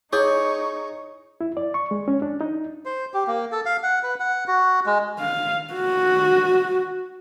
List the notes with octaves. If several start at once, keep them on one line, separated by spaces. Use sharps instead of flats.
D#4 E4 G#4 C#5 C#6 D6
E4
D5
C#6
G#3
C#4
D4
D#4
C5
G4
A#3
A4
F5
F#5
B4
F#5
F#4
G#3
F5
F#4